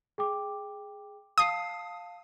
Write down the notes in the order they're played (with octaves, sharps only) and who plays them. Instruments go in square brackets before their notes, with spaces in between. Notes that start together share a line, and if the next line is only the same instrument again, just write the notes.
[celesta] G#4 G5 D6
[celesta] F5 A5 C7 [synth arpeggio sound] D#6